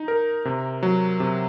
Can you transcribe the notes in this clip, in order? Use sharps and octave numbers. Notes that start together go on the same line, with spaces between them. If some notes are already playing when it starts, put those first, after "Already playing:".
Already playing: D#4
A#4
C3
F#3
C3